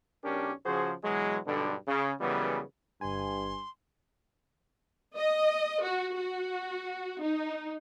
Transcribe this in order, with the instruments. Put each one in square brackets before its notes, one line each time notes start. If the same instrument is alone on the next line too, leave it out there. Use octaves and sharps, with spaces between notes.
[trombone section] B1 C#4 D4 G4 A#4
C#3 F3 F#4 G#4 C5
B2 E3 F#3 G#3
B1 G2 B2 D3
C#3
F#2 C#3 E3 G3 G#3 B3
[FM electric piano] G1 G#5 [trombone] G2 [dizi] C6
[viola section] D#5
F#4
F#4
D#4